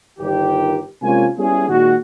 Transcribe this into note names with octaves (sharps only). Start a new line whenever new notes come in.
G1 D#3 G4
C3 G#3 A#3 C#4 F4 G#5
G3 B3 C#4 E4 G#4
A#2 D#3 G#3 F#4